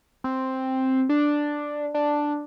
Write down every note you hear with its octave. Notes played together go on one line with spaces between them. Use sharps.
C4
D4
D4